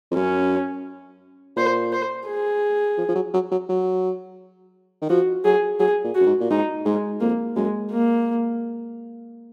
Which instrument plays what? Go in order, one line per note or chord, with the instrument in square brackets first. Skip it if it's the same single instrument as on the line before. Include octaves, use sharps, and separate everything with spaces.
[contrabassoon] F2
[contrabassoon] F#2 [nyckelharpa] C#4
[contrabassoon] A#2 [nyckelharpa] C5
[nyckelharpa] C5
G#4
[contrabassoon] F3
F3
F#3
F#3
F#3
F#3
D#3
[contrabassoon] F3 [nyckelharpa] F#4
[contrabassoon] F#3 [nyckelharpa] G#4
[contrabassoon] F#3 [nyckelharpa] G#4
[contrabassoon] A#2
[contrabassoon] F#2 [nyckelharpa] F#4
[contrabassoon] G#2
A#2
[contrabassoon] G#2 [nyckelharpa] D#4
[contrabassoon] G#2 [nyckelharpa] G#3
[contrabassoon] F2 [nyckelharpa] A#3
[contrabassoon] F#2 [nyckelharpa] G#3
[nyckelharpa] A#3